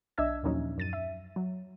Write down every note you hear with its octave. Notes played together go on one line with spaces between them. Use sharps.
B1 D4 D#5 E5 E6 G#6
D#2 A#2 F3 F#3 C#4 D#4
F#2 A6 D#7
E5
F#3